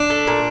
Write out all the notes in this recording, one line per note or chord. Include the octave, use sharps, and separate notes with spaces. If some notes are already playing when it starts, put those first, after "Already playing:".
Already playing: D4
A3
A#2